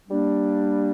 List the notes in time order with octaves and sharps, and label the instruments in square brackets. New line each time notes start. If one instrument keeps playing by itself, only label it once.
[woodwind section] G3 A#3 D4